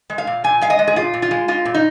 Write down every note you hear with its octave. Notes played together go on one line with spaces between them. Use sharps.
G#3
F5
A#2
A#2 G#5
G#3 F5
D#5
G#3
G#4
A#2 F4
A#2
F4
G#3
G#3 F4
A#2
D#4